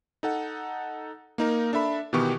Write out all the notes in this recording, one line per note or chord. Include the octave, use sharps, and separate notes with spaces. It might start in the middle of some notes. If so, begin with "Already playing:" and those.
D#4 A4 F#5
A#3 D#4 A#4
D4 A4 E5 B5
B2 D#3 E3 B3 G4 C#6